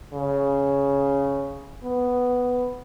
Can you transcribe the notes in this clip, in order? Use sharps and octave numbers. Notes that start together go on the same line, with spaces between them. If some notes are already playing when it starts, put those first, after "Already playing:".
C#3
B3